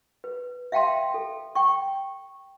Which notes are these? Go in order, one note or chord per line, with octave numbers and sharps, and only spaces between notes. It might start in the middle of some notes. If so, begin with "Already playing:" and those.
B4
E5 F5 G5 A5 C6
A4
G5 C#6